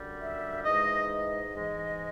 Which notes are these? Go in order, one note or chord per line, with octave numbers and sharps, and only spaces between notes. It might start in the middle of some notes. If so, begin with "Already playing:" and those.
Already playing: F#2 D3 G3
E5
G#2 E3 G#3 D#5
D#5
G#2 E3 G#3